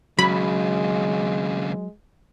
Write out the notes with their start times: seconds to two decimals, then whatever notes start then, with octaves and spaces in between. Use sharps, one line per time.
0.19 D#2 C#3 F#3 G#3 B5